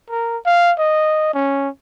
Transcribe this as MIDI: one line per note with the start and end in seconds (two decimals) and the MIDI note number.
0.10 0.37 70
0.46 0.72 77
0.79 1.30 75
1.34 1.68 61